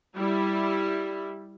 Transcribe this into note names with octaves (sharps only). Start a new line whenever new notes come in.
G3 E4